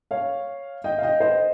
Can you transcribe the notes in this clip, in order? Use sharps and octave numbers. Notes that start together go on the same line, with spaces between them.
C#5 F5
D#5 G5
F5
D#5 G5
C5 D#5